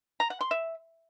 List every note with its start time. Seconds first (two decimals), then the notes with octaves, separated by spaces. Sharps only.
0.20 A#5
0.30 F#5
0.41 C6
0.51 E5